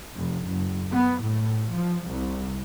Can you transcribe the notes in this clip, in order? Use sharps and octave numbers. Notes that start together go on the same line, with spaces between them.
F1
F#1
B3
A2
F3
C2